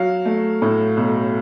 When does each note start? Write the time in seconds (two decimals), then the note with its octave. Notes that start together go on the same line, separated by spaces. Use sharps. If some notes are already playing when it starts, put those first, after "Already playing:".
Already playing: F#3 F5
0.25 A3
0.62 A2
0.97 B1